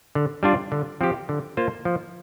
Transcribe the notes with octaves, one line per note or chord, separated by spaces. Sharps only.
D3
G3 D4 F4 D5
D3
F3 C4 G4
D3
A#3 F4 C5
F3